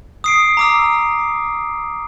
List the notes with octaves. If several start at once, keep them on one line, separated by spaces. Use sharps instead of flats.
D#6 C7 D7
A#5 D6 E6